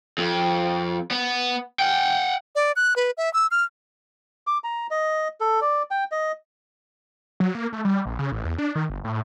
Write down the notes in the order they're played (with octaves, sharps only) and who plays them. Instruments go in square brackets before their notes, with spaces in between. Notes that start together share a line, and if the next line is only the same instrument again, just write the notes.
[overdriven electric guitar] F2
B3
F#5 G5
[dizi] D5
F#6
B4
E5
E6
F6
[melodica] D6
A#5
D#5
A4
D5
G5
D#5
[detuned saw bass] F#3
A#3
A3
G3
A#1
C#3
A1
E2
D4
D#3
G1
A2